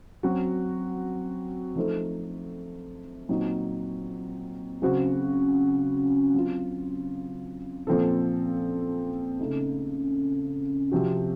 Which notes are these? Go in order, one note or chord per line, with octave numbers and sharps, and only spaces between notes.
F#3 C4 F#4
F3 A3 D#4 A4 C5
A#2 F#3 C4 D#4
C#3 F#3 C4 F#4 C5
F#3 C4 F4
A#2 F3 C4 F4 A4
C#3 A3 D#4 A4
C3 F3 C4 F#4